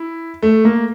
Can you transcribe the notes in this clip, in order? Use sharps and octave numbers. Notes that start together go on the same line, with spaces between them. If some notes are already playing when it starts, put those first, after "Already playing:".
Already playing: E4
A3
A#3